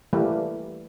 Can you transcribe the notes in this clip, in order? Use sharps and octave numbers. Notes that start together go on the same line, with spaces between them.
E3 G3 A3 A#3